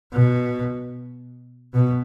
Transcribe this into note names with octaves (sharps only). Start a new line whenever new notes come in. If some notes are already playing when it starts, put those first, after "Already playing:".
B2
B2